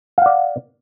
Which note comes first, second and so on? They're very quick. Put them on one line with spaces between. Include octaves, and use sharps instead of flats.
F5 F#5 D5